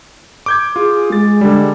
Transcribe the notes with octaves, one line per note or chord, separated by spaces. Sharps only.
D6 G6 G#6
F4 G#4
G#3 A6
D3 G3